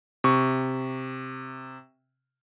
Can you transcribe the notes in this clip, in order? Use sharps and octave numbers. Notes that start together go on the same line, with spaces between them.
C3 C#6